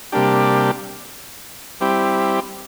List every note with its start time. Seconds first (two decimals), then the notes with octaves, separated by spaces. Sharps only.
0.12 C3 G3 A#3 D4 G4
1.81 G3 C4 E4 G4